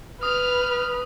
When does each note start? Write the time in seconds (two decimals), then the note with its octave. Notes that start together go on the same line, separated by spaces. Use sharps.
0.23 B4 D#6 F6